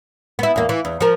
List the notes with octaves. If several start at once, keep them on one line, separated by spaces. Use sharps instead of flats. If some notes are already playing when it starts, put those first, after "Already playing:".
B3 E4
E2 A#3
E3
E2
F3 A#4